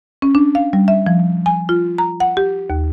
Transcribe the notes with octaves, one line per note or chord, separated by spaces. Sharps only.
C#4
D4
F5
G3
E5
F3
G#5
F4
A#5
F#5
G4
D#2